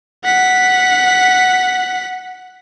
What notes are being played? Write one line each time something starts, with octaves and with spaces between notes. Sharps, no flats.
F#5 B6